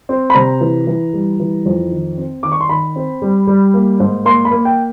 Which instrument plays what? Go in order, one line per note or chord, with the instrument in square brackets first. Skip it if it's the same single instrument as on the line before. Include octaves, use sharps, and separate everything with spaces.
[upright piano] C4
B5
C3 A#5
E3
E3
G3
E3
F2
D#3
C4
D#3 D6
C#6
C6
D#3 B5
C4
G3
G3
A#3
G#2
A#3 C6
B5
A#3
G5